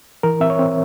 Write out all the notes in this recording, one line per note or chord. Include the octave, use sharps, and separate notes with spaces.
E3 A#4
C4 E5
C#5
C4